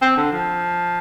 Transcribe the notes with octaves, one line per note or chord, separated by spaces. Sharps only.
C4
D3
F3